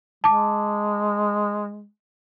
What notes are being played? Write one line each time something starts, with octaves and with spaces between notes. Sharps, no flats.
G#3 A5 D6